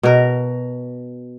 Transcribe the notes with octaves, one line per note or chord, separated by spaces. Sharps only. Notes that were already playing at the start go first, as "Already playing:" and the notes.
B2 A#4